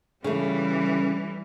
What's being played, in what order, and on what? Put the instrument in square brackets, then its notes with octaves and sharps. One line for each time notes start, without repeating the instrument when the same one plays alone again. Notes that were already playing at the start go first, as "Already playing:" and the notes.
[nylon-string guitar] C#3 A3 [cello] E3 G3